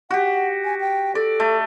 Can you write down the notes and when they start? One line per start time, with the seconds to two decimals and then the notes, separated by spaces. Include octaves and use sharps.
0.11 F#4 G4 F#5
0.64 G#5
0.80 G5
1.15 A4 D5
1.40 A3